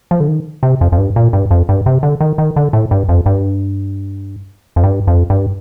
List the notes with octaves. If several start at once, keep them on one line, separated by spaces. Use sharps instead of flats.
F3
D3
D#3
C3
F2
F2
G2
A#2
G2
F2
G2
C3
D3
D#3
D#3
D3
A2
G2
F2
G2
F2
G2
F2
G2